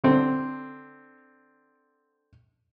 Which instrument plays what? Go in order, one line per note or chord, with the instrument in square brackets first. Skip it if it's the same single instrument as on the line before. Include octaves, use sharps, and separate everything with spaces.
[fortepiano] D3 C4